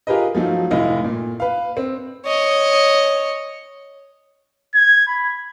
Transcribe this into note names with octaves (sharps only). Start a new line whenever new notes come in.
F4 G4 G#4 A#4 B4 D#5
F3 F#3 A3 D#4 F4
F1 A2 E4 D#5 F5
A#2
B4 F5
C4
C#5 D#5
G#6
B5